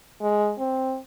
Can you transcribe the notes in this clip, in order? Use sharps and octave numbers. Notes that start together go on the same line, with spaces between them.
G#3
C4